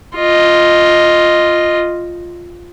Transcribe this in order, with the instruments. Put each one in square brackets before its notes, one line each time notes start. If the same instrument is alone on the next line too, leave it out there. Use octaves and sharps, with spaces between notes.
[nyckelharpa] F4 D#5